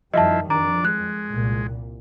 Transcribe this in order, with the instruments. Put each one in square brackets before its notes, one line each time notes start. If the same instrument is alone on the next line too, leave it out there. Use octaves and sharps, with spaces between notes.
[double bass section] F#2 D#3 G3 [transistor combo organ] F3 E4 [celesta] D#5 E5 A5
[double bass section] F2 [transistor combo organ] D4 D5 [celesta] A#5
[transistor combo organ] G#3 [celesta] F#6
[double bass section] C2 A#2